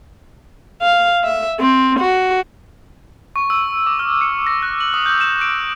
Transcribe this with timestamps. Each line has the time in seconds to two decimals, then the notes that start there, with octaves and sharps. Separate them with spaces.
0.82 F5
1.25 E5
1.60 C4
2.00 F#4
3.36 C#6
3.50 E6
3.86 D6
3.99 F6
4.21 C#7
4.47 A#6
4.62 F#6
4.80 F#7
4.94 D#6
5.06 G6
5.21 E7
5.41 D7